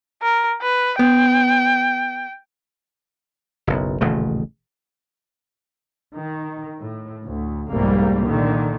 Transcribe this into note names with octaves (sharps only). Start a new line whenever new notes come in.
A#4
B4
B3 G5
F#1 B1
D#1 A1 C#3 A3
D#3
A2
D2
F1 C2 G#2 G3 A3 A#3
A#2 D3 D#3